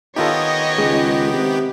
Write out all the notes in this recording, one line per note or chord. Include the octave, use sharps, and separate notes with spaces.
D#3 B3 D#4 F4 G4 A4 C#5 D#5
C#2 G#3
C3